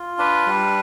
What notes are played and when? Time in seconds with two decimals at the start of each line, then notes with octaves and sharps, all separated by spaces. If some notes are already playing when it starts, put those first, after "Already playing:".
Already playing: F4
0.19 D4 B4
0.46 G3